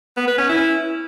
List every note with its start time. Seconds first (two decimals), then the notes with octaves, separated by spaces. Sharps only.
0.17 B3
0.27 B4
0.38 C#4
0.49 E4